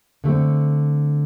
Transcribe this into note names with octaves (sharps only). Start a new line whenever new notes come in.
D3 A3 C4